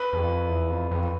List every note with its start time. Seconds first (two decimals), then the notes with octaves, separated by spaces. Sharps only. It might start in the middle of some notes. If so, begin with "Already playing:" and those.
Already playing: B4
0.13 E2
0.17 F2
0.49 E2
0.70 F2
0.91 F2